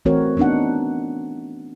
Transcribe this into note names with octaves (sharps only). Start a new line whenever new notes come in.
E3 A3 C4 F#4 A#4 C#5
B3 C4 D4 D#4 F#5